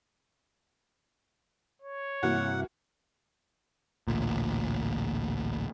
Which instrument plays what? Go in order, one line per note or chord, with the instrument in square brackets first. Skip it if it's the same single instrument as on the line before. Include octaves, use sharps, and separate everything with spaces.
[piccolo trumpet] C#5
[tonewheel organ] G2 C3 E4 [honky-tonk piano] E3 A#3 F#4 [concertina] F#5
[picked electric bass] A1 D2 A#2